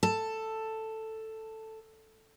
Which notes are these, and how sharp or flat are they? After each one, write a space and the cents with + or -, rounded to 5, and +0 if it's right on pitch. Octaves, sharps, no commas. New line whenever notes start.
A4 +5 A5 +10